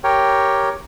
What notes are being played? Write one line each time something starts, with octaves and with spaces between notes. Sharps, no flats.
G4 A#4 C#5 G5